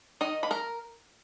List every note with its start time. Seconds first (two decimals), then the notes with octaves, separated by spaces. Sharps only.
0.21 D#3 D#4 D#5
0.43 A#3 B5
0.51 A#4 A#5